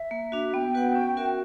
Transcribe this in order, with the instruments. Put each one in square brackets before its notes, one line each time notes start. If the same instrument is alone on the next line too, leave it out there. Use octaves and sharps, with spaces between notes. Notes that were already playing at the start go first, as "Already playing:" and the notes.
Already playing: [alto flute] E5
[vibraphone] A#3
D4 F#4
[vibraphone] B3 [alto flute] G5
[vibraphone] F#4 B4 F#5
C#4
F#4 A#4 E5